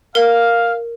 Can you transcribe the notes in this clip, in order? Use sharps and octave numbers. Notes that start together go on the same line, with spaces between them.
A#4 F5